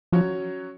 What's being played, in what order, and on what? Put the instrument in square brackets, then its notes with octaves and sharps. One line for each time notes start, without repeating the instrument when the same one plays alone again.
[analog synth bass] F3 [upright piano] F#3 C#4 F#4 C#5